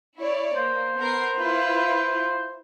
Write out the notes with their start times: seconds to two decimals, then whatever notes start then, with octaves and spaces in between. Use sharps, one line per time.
0.19 E4 C#5 D5
0.55 A#3 C5
0.98 B3 A#4 C7
1.35 E4 F4 B4